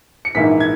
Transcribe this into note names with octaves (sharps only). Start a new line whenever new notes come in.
C#7
A#1 G#2 E3 A#3 E4 B6
G#6